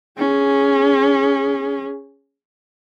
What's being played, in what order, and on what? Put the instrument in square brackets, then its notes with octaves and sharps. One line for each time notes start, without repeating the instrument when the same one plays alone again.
[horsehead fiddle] C#4 G#4